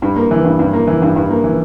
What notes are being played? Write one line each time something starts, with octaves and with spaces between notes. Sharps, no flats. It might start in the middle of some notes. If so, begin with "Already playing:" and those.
G2
A#3
E3
G2
G2
A#3
E3
G2
G2
A#3
E3